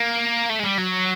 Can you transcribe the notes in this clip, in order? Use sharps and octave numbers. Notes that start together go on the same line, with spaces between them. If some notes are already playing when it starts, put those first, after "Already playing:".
Already playing: A#3
A3
G#3
G3
F#3